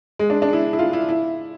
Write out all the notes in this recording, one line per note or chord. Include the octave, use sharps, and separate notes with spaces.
G#3
D4
D4
E4
E4
F4
E4
E4